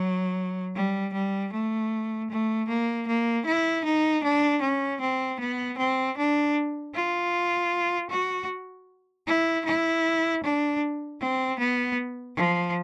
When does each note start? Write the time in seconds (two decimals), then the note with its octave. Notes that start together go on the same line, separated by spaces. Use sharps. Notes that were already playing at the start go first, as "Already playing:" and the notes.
Already playing: F#3
0.75 G3
1.13 G3
1.52 A3
2.30 A3
2.68 A#3
3.07 A#3
3.46 E4
3.84 D#4
4.23 D4
4.62 C#4
5.00 C4
5.39 B3
5.78 C4
6.17 D4
6.94 F4
8.10 F#4
9.27 E4
9.65 E4
10.43 D4
11.20 C4
11.59 B3
12.36 F3